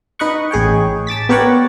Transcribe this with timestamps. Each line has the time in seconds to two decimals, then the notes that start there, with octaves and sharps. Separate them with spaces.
0.19 D#4 B4 D#5 F#5 C#6
0.51 A1 G#4 C#5 G5
1.07 A5 D6 A6 B6
1.29 B3 G4 A#4 C#5 D5 F#5